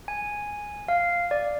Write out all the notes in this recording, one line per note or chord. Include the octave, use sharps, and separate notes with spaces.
G#5
F5
D5